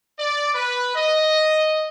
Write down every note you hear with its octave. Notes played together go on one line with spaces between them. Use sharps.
D5
B4
D#5